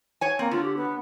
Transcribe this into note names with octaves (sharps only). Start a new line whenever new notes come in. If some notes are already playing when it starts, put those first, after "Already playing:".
C#5 G#5
A#3 C4
D3 F4
G4
B3